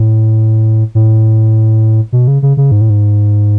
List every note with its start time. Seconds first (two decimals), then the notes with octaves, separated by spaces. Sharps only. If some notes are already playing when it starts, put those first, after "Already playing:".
Already playing: A2
0.95 A2
2.12 B2
2.28 C#3
2.42 C#3
2.57 C#3
2.72 G#2
2.81 A2
2.90 G#2